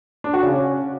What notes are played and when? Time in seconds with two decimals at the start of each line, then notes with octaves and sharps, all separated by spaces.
0.24 D4
0.33 F#4
0.43 C#3
0.52 C#4